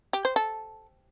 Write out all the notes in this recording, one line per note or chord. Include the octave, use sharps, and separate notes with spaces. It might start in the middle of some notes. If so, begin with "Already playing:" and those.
G4
C5
A4